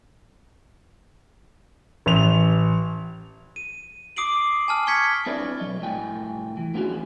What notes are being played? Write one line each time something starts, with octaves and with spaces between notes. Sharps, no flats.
A1 F7
D#7
D6 D#6 C7 D7 F#7
G#5 A5 F6
C#6 F6 G#6 B6 C#7
C4 D4 E4 B4 D5
B1 F2 F#3 D#5
C2 A2 G5 G#5
E3
A3 B3 C#4 D4 F#4 G#4